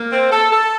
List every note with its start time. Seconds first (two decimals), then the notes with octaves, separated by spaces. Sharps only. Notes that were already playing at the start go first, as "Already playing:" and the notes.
Already playing: A#3
0.12 C4
0.32 A4
0.52 A4